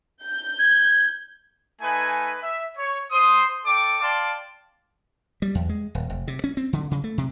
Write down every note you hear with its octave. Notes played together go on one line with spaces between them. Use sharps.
G6
G#6
A3 D#4 B4 G#5
E5
C#5
C5 C6 D#6
A4 D5 G5 D6
D5 F5 G5 A5 C6 D6
G3
E2
G#3
D#1
F1
C3
C#4
C4
D3
C#3
A3
C3